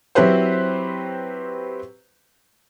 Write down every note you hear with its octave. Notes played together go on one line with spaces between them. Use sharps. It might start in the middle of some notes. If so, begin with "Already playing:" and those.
F#3 C4 E4 G4 B4 C5